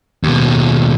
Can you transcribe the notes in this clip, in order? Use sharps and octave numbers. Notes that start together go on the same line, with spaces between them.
D#2 B2